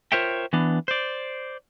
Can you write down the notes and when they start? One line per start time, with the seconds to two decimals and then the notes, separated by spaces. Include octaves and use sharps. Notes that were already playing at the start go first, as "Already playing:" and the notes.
0.12 F4 A#4 C5 C#5 E5 G5
0.53 E3 B3 D4
0.88 C5 D5